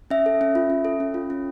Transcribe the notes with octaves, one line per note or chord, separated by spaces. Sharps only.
C#4 E5
A4
C#4
F4
C#4
A4
C#4
F4
C#4